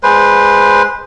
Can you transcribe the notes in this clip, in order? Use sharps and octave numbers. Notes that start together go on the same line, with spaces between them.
G#3 B4 C5